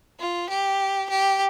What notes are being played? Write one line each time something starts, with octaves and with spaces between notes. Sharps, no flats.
F4
G4
G4